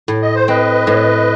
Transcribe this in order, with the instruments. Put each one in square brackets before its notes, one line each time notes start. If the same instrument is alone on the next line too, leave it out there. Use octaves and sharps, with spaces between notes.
[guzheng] A2
[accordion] D#5
C5
[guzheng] C4 [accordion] B4 D#5
[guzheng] A2